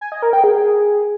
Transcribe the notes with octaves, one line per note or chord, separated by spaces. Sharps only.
G#5
D#5
A#4
G5
G#4